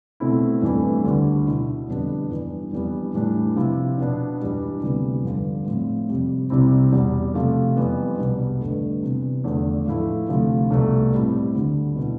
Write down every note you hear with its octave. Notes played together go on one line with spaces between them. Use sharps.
B2 A3 C4 E4
G2 E3 A3 C4 E4
D2 D3 G3
B2 B3 E4
F2 D3 G3 B3 D4
G2 E3 B3
F2 E3 G3 B3 D4
A2 E3 G3 D4
C3 F3 C4 E4
B2 B3 D4
G2 E3 G3 D4
D2 C3 E3 G3 B3
G2 D3 F3
A2 F3 C4 E4
F2 C3 G3 C4
C2 C3 G3 C4 E4
E2 B2 G3
C3 F3 A3
F2 E3 G3 B3
C2 B2 G3
G2 D3 A3
C3 E3 B3
E2 D3 F3 A3
A2 F3 A3 E4
D2 C3 F3 A3
C2 B2 A3
A2 G3 C4 E4
D2 D3 G3
B2 B3 E4